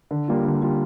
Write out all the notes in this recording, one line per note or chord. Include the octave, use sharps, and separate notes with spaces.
D3
G3 A#3 F4
D3
G3 A#3 F4